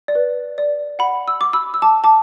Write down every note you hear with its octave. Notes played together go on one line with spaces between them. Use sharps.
D5
B4
D5
F#5 B5
E6
D6
B5 E6
E6
A5 D6
A5 D6